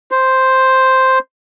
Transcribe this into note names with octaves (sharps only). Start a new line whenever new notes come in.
C5